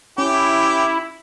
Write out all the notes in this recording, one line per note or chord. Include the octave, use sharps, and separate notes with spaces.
C#4 E4 G4